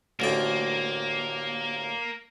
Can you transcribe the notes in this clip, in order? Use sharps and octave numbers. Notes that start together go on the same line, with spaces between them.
A1 D2 A#3 G5